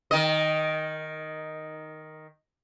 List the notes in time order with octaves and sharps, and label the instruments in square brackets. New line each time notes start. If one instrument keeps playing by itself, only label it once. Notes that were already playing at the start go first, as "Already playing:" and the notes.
[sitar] D#3 D#5